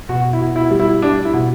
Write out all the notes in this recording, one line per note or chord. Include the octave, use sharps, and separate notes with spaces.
B2 F#4
E4
B2
E4
G3
E4
G3 D4
E4
B2